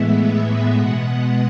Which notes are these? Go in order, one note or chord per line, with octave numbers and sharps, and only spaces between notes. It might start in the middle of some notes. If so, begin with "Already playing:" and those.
Already playing: A2 E3 G#3 B3 E5
B2 G#3 B3 F#5